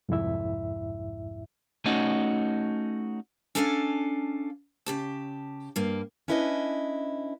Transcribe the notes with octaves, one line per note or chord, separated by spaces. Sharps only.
C2 F2 G#2 E4 E5
A3 C#4 D#4 F#4
C#4 D4 A4 F5 F#5 G#5
C#3 G4 A5
G2 A#3
C#4 D4 E4 B4 C5 D#5